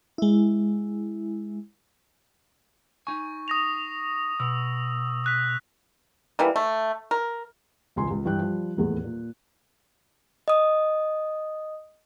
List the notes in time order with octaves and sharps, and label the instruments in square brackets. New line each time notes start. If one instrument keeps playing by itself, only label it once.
[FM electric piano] G#3 E4
[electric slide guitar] D#4 G#5 [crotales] C#6
[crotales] D#6 A#6 F7
[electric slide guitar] B2 [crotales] E6
[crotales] D#6 F#6 B6
[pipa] E3 G3 A#3
A3
A#4
[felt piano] E1 C#2 G#5 C6
C#2
G2 E3 G5 F#6
F3 G3
D#1 E2 A2 G#4
A#2
[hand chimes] D#5 D#6